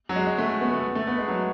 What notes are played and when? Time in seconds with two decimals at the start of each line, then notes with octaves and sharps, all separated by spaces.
0.09 F#3
0.16 G#3
0.27 G#3
0.38 A3
0.61 B3
0.73 A3
0.95 A3
1.07 B3
1.18 G#3
1.28 F#3